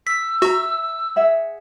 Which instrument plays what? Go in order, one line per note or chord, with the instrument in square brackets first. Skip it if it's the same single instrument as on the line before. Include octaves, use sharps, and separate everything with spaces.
[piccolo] E6 [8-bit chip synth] B6
[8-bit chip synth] F#4 [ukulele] E5 A#5
[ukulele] G#4 E5 F#5